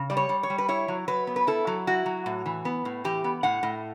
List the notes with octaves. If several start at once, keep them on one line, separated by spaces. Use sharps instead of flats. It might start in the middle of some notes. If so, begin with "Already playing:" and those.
Already playing: C#3
G3 D5
C#5
G3
C#5
G3
B4
E4 C#5
F#3
F#3 B4
B3
B4
E4 A4
F#3
E4 F#4
F#3
A2
E3
B3
A2
E3 G4
B3
A2 F#5
A2